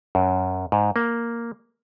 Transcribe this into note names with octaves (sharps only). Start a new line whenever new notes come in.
F#2
G#2
A#3